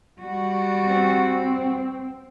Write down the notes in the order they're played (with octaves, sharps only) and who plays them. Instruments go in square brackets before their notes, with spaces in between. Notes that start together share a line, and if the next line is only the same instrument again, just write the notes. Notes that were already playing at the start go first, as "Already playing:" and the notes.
[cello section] G3 F#4
[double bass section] C4